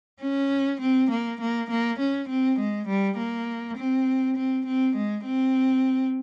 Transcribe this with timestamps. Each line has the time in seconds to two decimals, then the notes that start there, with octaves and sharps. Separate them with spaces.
0.22 C#4
0.81 C4
1.11 A#3
1.41 A#3
1.70 A#3
1.99 C#4
2.29 C4
2.60 G#3
2.88 G3
3.18 A#3
3.77 C4
4.36 C4
4.66 C4
4.96 G#3
5.25 C4